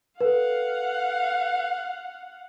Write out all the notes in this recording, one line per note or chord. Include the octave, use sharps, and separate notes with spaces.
A4 B4 F5 F#5